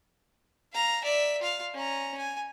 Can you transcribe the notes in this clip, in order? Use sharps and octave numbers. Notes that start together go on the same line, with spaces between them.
F5 A#5
D5 E5
F4 F5
C#4 A#5
G#5